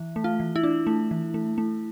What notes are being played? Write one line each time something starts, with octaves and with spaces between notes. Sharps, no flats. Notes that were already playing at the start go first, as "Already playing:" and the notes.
Already playing: E3
A3
F4
E3
E4
D4
A3
E3
A3
A3